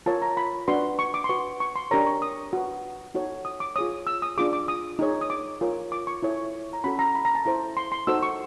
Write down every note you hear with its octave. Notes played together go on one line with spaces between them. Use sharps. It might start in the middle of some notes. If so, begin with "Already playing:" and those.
F4 A#4 C#5 A5
A#5
B5
D4 F#4 B4 C6
C#6
D6
C6
F#4 B4 C#6
C#6
C6
D4 G4 A#4 C#5 A#5
C#6
D#6
F#4 B4
D#4 F#4 A4 C#5
D#6
D6
F4 G#4 C#5 D#6
E6
D#6
D4 F4 G#4 D6
D6
D#6
D#4 G#4 C#5
D#6
D6
F4 A#4 C#5
D6
C#6
E4 A4 C#5
A#5
C#4 F#4 A4 B5
A#5
B5
A#5
A5
E4 A4 C5 A#5
C6
C6
D#4 F#4 A4 C5 E6
C#6